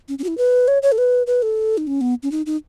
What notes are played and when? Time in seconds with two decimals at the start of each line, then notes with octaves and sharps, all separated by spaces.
0.09 C#4
0.19 C#4
0.24 F#4
0.28 E4
0.38 B4
0.68 C#5
0.82 C#5
0.92 A4
0.98 B4
1.27 B4
1.42 A4
1.78 D#4
1.87 C#4
2.01 B3
2.23 C#4
2.32 D#4
2.46 D#4